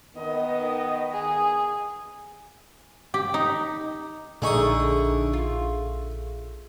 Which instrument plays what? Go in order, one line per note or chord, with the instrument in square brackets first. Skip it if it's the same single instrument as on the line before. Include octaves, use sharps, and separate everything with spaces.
[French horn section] D#3 B3 [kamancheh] D#5
[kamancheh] G#4
[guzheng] G4
D#4
[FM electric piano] A#1 G#4 A4 [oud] D3 D#4 [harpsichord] A3 C#6 D#6
[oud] F4